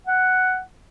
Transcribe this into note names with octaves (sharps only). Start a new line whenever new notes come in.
F#5